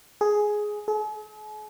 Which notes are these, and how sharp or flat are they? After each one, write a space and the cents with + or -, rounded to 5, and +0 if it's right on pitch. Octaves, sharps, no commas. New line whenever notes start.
G#4 +10
G#4 +45